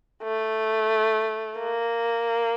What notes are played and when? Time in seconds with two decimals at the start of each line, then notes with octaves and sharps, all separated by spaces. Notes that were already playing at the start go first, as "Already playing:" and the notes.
0.23 A3
1.58 A#3